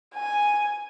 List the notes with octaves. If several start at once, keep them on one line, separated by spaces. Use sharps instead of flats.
G#5